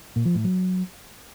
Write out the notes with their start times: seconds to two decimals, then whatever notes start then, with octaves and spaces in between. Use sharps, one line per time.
0.16 A#2
0.25 F3
0.35 A2
0.44 F#3